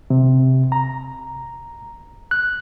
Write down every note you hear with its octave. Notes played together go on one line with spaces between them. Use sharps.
C3
A#5
F#6